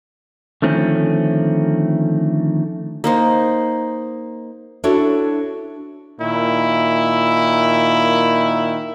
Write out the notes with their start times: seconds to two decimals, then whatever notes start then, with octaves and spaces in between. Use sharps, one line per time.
0.62 D3 D#3 F3 A3 C4 C#4
3.04 A#3 D#4 C5
4.84 D4 E4 F#4 A4 C#5
6.21 A#2 D#3 E4